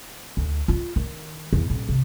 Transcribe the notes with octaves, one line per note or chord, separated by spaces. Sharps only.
D2
F4
D#3
E2
D#1
C3